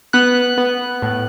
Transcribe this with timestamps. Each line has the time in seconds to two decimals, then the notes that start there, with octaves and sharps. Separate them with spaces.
0.13 B3 F#6
0.58 B3
1.02 A2